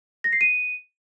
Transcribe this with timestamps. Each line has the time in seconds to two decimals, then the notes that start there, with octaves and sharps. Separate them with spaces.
0.24 A#6
0.33 C7
0.41 D#7